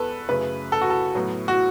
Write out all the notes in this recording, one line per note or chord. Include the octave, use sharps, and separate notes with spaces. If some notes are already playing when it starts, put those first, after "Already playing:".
Already playing: E2 B3 A4 B4
F#2 C#3 A3 B4
A4
F#4
A4
A2 F#3 B3
F#4